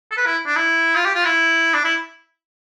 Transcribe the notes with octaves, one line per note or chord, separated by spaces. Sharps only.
A4
B4
E4
D4
E4
F4
G4
F4
E4
D4
E4